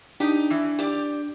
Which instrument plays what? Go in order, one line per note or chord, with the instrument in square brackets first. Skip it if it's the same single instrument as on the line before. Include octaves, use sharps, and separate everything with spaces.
[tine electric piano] D4 [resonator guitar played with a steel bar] D#4 G4
[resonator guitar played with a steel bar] E3
G4 D5